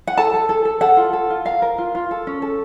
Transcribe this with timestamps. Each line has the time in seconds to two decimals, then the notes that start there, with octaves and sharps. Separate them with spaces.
0.07 F#5
0.17 A4 A5
0.34 A4
0.49 A4
0.65 A4
0.81 A4 F#5
0.97 F4
1.13 A4
1.30 F4
1.45 A#4 F5
1.62 A#4
1.78 F4
1.95 F4
2.11 A4
2.27 C#4
2.42 A4